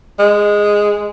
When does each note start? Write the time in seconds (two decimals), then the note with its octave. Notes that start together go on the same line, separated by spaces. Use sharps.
0.19 G#3